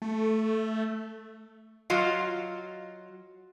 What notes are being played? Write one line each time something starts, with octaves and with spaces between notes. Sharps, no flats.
A3
F#3 F4 D#5 F5